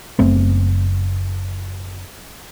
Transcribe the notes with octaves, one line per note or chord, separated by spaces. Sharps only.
F#1 A3 B3 C4